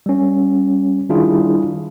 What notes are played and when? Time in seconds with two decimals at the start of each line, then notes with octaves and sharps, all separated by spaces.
0.06 G3 C#4
1.09 D#3 G3 D4 E4 F4 G#4